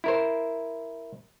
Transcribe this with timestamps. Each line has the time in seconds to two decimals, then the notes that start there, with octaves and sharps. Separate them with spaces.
0.04 E4 A#4 C5